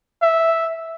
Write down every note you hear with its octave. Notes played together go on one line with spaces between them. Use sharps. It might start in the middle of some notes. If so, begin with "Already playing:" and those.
E5